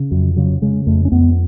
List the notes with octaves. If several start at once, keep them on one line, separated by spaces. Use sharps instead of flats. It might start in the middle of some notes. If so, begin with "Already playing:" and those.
Already playing: C#3
F2 F#3
C#3 F#3
C#3 G#3
F2 A3
C#4
F2 B3